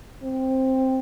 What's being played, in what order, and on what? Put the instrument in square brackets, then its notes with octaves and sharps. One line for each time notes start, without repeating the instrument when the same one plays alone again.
[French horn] C4